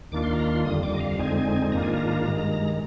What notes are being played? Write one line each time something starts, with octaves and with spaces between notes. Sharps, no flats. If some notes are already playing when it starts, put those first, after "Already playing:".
D#2 D#3 A#3 D4 F4 D6
C6
A#5
C6
F2 D3 G3 D#6
D6
D#5
F5
F2 D3 G#3 C4 D#4 G#5
G#2 D#3 A#3 D4 F4 A#5
G#5
A#5
G2 D#3 G#3